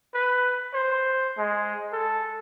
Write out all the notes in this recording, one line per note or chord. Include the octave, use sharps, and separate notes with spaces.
B4
C5
G#3
A4